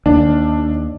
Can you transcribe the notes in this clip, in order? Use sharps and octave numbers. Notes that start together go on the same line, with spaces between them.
D#2 D4